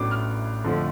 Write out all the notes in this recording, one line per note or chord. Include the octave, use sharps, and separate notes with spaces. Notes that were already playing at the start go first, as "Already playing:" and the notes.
Already playing: A1 A2 F#3 B3 D4 D6
F6
F2 D3 F3 A3